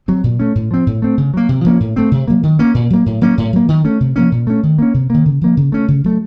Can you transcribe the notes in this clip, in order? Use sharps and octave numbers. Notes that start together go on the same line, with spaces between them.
F#3 C4
A#2
A3 C#4
A2
F3 C4
A2
A3 C4
C#3
F#3 A#3
C3
F3 A#3 C#4
A2
A3 C4
C3
F#3 A#3
D#3
A#3 C#4
A#2
F#3 A#3
A2
F#3 A#3 C#4
A2
F#3 A#3
D#3
A3 C#4
C3
F3 A#3 C#4
A#2
A3 C#4
D#3
A#3 C#4
C3
D#3 A#3
C#3
F3 A#3
C#3
A3 C#4
C#3
F#3 A3